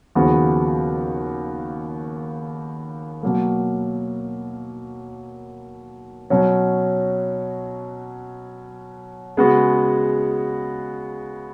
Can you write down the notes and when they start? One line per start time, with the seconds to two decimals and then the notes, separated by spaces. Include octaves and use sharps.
0.15 D#2 C#3 F3 B3 F#4
3.23 B2 F#3 A#3
6.30 B2 F#3 C#4 F#4
9.37 C#3 G#3 B3 F#4